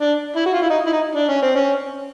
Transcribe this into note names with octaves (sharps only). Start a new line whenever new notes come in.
D4
E4
F#4
F4
E4
D#4
E4
D#4
D4
C#4
C4
C#4